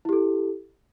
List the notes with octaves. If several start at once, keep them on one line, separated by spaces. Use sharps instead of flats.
E4 G4 A4